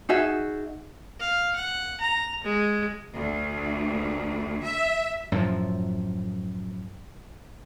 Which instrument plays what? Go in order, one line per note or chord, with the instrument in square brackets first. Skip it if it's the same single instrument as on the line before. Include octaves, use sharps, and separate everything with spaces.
[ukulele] D#4 F#4 G#4 E5
[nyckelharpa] F5
F#5
A#5
G#3
[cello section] D2
E5
[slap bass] F#2 A2 F3